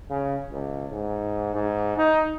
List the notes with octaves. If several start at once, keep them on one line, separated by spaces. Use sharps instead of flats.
C#3
C#2
G#2
G#2
D#4